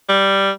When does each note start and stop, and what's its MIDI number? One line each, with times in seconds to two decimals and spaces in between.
0.09 0.51 55